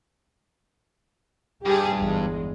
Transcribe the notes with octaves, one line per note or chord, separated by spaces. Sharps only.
G2 G4 G#4
G1 E2 G#3